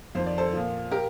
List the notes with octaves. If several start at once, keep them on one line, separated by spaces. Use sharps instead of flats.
F2 D#3 C5
D5
A4 C5
A#2 F3
G4 A#4